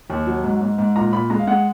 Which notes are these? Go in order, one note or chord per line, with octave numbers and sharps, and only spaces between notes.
D#2
F#3
G#2
G#2
G#2
A#2 A#5
A#2 B5
G#3 A#5
F5
G#3 F#5